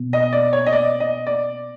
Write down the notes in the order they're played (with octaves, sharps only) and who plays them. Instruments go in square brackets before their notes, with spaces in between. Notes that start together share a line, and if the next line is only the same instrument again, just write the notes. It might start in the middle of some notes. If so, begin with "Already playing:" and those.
Already playing: [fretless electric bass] B2
[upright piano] D#5
D5
C#5
D#5
D5
D#5
D5